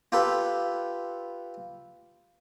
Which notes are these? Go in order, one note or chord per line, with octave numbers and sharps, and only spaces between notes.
F4 G4 A4 B4